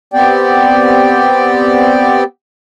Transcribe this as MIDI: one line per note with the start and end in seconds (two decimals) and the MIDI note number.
0.14 2.24 59
0.14 2.24 60
0.14 2.24 67
0.14 2.24 74
0.14 2.24 79